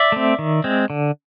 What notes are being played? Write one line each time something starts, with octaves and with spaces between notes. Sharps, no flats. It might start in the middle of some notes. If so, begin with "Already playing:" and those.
Already playing: D5 E5
A3 C4
D#3
G#3 C4
D3